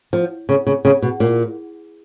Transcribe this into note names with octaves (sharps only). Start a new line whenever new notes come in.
F3
C#3
C#3
C#3
B2
A#2